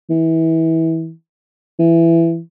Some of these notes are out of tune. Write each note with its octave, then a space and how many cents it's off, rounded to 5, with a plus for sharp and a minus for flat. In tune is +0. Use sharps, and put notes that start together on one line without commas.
E3 -25
E3 +15